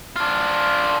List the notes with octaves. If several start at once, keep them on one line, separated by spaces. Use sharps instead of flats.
D4 F4